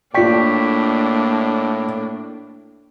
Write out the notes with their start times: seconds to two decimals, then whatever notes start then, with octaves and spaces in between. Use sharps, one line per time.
0.14 A2 A#3 D4 F4 D5 G5 C#6 B6